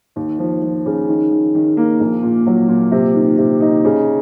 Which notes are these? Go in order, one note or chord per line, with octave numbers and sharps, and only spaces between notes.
D#2
F3
F3
C#3
D#3
D#3
D#3
A#3
A#1
A#2
F#3
A#2
C3
D#3
C3
D#4
C#3